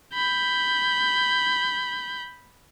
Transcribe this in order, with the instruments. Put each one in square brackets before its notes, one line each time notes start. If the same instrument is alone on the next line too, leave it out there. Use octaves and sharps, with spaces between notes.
[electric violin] B5 G6